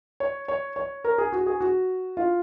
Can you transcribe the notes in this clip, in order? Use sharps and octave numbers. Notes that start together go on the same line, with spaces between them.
C#5
C#5
C#5
A#4
G#4
F#4
G#4
F#4
F4